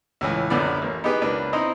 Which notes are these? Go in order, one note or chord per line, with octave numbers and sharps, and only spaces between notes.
C#2 A2 E3
A#1 F#2 D3 B3 D5
A1 A#3
B3 D#4 E4 G4 G#4 B4
C#2 A#3 D4 B4
C4 D#4 E4 D#5 A#5